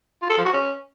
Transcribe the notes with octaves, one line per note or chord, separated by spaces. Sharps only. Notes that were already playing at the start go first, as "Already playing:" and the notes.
F4
A4
F3
F#4
C#4